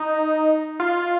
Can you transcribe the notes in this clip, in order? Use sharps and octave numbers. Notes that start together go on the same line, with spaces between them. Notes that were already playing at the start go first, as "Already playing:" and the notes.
Already playing: D#4
F4